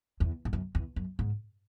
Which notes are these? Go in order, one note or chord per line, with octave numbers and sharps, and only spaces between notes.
E2
G#2
F#2
E2
F#2
G#2